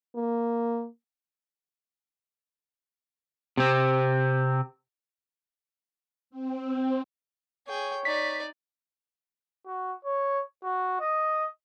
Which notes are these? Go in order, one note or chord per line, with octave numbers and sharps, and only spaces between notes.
A#3
C3 C4
C4
G#4 C#5 G5
D#4 D5 B6
F#4
C#5
F#4
D#5